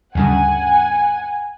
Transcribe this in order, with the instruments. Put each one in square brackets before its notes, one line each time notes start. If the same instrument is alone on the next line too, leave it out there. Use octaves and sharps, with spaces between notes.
[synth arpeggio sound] D2 G2 C#3 [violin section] F#5 G#5